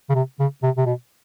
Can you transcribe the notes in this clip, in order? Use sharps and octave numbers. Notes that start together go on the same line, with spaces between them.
C#3
C3
C#3
C3
C3
B2